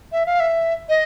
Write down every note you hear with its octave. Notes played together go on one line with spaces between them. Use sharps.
E5
F5
E5
D#5